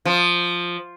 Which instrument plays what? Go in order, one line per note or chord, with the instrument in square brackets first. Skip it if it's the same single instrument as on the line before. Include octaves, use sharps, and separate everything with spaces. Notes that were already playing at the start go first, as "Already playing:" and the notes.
[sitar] F3